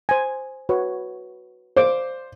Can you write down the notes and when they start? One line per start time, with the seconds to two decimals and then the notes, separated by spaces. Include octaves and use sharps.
0.09 C5 G#5
0.69 F#4 B4 C#5
1.76 C5 D5 F5 D6